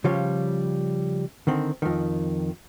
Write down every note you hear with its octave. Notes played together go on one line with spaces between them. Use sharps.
C#3 F3 G3 C#5 F5
D3 D#3 C4
F2 D#3